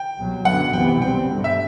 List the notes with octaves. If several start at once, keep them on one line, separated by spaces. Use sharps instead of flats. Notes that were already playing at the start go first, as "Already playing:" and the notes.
Already playing: G5
C2 B2 F#3
F#2 D3 F#3 B3 F#5
C2 C3 E3 B3 G5
G5
B2 G3 C4 G5
G2 D3 A3
E5